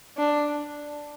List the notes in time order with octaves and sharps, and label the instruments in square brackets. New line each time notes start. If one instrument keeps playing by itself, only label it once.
[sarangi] D4